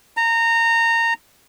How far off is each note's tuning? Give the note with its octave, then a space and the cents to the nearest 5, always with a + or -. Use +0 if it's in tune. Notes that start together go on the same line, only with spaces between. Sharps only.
A#5 -20